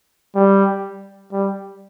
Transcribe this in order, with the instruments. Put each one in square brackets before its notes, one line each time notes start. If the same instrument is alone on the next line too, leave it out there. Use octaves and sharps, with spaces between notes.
[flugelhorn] G3
G3